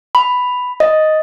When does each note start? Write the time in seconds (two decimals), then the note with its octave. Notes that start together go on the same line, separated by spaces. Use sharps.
0.15 B5
0.80 D#5